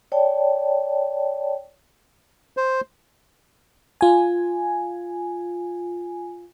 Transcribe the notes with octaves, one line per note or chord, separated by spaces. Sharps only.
C#5 D5 G5 A5
C5
F4 G#5